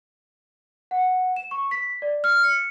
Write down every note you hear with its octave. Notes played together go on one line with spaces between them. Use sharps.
F#5
E7
C#6
B6
D5
F6
C#7